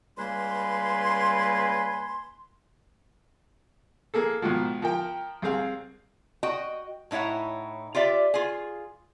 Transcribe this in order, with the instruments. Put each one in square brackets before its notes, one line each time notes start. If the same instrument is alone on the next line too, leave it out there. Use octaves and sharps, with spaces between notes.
[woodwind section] C#2 G3 A#3 B4 G#5 C6
[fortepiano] A#3 G#4 A4
G#2 B2 D#3 F3
F3 A#4 G5
C2 C4 G#4 F5
[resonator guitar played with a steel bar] F#4 D#5 G5
A2 D#4 E4 C#5 F#5
F4 G4 D5 E5
F4 G#4